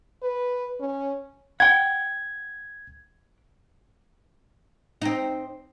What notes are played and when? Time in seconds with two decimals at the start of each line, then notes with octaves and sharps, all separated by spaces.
0.23 B4
0.80 C#4
1.60 F#5 G5 G#6
5.02 C4 D#4